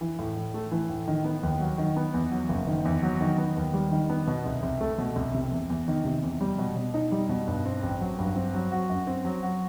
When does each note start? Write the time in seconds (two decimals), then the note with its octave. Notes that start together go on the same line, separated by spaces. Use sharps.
0.01 E3
0.19 A2
0.36 A2
0.54 A3
0.71 E3
0.89 A2
1.08 D#3
1.25 B3
1.43 D#2
1.61 F#3
1.78 D#3
1.97 B3
2.14 E2
2.31 F#3
2.49 F#1
2.67 D#3
2.85 E2
3.02 F#3
3.21 D#3
3.38 B3
3.56 D#2
3.74 G3
3.91 D#3
4.09 B3
4.27 B2
4.46 C2
4.63 C2
4.81 A3
4.98 B2
5.16 C2
5.34 C3
5.52 E2
5.69 E2
5.88 D#3
6.05 C3
6.23 E2
6.41 G3
6.58 B2
6.76 B2
6.94 D#4
7.12 G3
7.29 B2
7.48 G2
7.65 C4
7.83 A1
8.01 F#3
8.19 G2
8.36 C4
8.54 F#3
8.72 F#4
8.90 F#2
9.07 C4
9.25 F#3
9.43 F#4